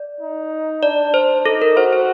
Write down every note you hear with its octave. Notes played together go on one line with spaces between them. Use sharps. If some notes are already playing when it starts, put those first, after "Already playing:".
Already playing: D5
D#4
D4 D5
C5
D#4 A4
A#4
F#4 C5
C5